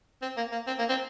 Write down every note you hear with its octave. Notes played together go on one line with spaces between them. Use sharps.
C4
A#3
A#3
C4
A#3
C4